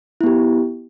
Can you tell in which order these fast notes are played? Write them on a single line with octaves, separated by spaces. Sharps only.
E4 B3 G4